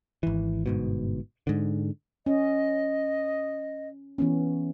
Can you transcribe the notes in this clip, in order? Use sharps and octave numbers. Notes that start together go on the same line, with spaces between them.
G#1 E3
G1 G#2 B2
G#2 D3
C#4 D#5
E3 B3 C#4